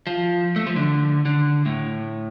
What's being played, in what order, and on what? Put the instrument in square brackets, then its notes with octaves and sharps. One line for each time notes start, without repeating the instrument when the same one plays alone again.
[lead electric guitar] F3
A3
F3
D3
D3
A2